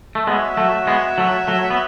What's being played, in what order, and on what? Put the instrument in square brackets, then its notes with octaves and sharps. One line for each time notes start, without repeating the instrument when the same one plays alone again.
[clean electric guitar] A3
[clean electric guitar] G#3 B3 [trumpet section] F#4 C#5 E5
[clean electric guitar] F#3 A3
G#3 B3
F#3 A3
F#3 A3
B3